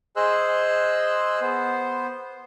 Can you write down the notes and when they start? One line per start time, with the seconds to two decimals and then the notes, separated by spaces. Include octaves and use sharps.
0.16 G#4 C5 D#5 C6 E6 F#6
1.41 B3 C5